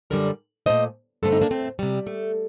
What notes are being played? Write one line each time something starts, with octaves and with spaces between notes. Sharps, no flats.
F#2 D3 G3 A#4 D5
A#2 A3 C5 D#5
G2 D3 A3 A4 C5
C4 D#4
A#3 D4
A3 C4
C3 G3
A3